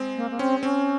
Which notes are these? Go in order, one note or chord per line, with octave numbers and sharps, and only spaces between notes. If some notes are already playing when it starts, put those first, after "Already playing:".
Already playing: G#3 C4
A#3
A#3
C4 C#4
C4 C#4